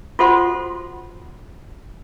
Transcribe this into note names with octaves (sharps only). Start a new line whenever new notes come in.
F4 F#4 A4 C5 F#5 C6